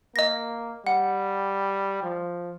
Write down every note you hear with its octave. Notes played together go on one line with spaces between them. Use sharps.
A#3 D#5 A#6
G3 F#5
F3